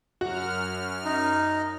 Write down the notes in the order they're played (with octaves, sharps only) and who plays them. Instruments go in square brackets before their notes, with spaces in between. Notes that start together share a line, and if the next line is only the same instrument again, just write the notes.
[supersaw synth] F#2 F6 [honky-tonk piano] F#4
[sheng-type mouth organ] D#4